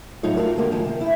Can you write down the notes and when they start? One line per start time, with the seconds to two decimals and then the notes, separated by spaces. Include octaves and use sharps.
0.23 F2 A2 F#3 D#4 F4 C#5
0.36 A3 C4 F4 F#4 A#4
0.57 D3 G#3 A#3 F4 G4
0.71 G#2 D#3 F3 G#3
0.85 C3 D#3
1.01 E4